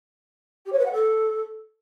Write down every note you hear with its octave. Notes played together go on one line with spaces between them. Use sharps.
G4
C#5
B4
F#5
A4